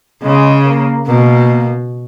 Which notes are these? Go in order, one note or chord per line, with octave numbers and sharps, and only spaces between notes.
C#3 G#3
A#3
B2 A#3